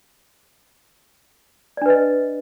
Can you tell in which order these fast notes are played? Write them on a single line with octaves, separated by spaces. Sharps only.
D5 D4 B4 D#5